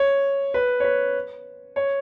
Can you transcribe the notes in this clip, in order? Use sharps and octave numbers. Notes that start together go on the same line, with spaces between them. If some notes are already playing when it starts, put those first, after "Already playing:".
Already playing: C#5
B4
C#5
B4
C#5